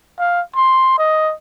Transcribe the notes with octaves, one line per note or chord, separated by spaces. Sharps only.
F5
C6
D#5